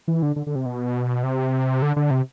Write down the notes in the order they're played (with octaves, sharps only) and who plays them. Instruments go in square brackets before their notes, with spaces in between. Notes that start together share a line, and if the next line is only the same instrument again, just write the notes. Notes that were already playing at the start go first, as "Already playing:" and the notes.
[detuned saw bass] E3
D3
D3
D3
C3
B2
C3
D3
D3
C3